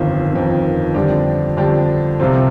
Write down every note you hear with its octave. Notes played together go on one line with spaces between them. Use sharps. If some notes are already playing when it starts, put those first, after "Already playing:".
Already playing: G1 F2 D#3
G1 F2 D#3
F2 D3 G3 D4 G4
F2 D3 G3 D4 G4
C2 C3 F3 C4 F4